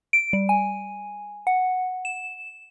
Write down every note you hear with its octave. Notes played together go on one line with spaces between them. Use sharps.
D7
G3
G#5
F#5
E7